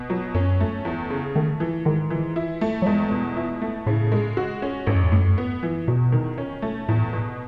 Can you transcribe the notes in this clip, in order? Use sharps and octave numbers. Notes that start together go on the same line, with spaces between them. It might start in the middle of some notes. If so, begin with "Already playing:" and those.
Already playing: B2
F#3
F#2 C#4
A3
E2
C#3
D#3 A3
E3
G#2 D#3
E3
E4
A3
F#3
E2 G#3
B2
E4
A3
A2 C#3
G#3
F#4
C#4
A1 G#2
F#2
E2
F#2 A2
B3
E3
E2 B2
D#3
C#4
A3
E2 A2
B2